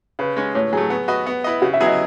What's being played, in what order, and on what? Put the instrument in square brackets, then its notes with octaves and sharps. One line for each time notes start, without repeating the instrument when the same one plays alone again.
[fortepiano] C#3 [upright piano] B4
[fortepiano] G#3 C#4
[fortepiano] A2 [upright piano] C#5
[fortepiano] F#3 A3 [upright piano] G#4
[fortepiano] B3
F#4 B4 D#5
B3
E4 B4 D#5
[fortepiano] C#3 [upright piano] F#4
[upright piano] E5
[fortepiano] F#3 B3 E4 G#4
[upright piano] D#5